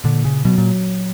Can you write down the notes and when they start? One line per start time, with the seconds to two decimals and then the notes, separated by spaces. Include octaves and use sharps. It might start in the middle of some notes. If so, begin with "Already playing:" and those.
0.04 A#2 D3
0.24 A#2 C#3
0.45 B2 F#3
0.58 A#2